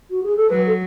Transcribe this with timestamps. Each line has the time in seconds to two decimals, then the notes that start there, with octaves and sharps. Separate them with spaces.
0.10 F#4
0.23 G#4
0.36 A4
0.49 F#3 B4
0.66 A4